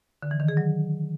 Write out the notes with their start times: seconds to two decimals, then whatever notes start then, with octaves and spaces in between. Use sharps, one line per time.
0.22 D3
0.31 E3
0.40 D#3
0.48 G#4
0.57 F#3